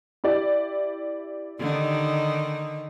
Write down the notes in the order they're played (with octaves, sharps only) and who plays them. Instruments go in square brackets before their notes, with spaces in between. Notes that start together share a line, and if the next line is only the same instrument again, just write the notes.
[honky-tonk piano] E4 G4 D5
[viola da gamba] D3 D#3 D#4